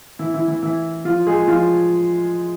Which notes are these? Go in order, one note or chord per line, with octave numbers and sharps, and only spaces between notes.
E3 E4
E3 E4
E3 E4
E3 E4
F3 F4
G#3 G#4
F3 F4